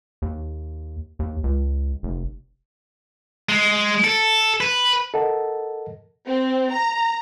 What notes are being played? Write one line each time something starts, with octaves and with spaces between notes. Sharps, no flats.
D#2
D#2
C#2
F1
G#3
A4
B4
A4 A#4 D#5 F#5 A5
C4
A#5